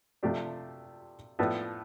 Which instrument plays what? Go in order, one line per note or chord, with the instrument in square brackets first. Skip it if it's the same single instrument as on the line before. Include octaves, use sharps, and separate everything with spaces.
[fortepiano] C3 F3 A3 D4 G4
A2 F3 B3 D4 A4